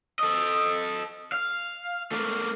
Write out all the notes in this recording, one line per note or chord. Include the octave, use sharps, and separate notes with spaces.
A4 D#5
F5
A3 A#3